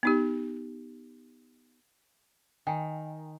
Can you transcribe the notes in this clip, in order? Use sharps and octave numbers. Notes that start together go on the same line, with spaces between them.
B3 D#4 G4
D#3 G5 G#5